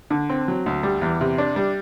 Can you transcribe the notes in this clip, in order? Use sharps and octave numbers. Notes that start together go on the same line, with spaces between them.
D3
C4
F#3
D2
G3
E2
C3
D4
G3